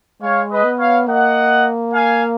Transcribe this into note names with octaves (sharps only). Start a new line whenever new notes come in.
G#3 C#5 F5
B4 D#5
B3
C#5 F5
A#3 D#5 F#5
F5 G#5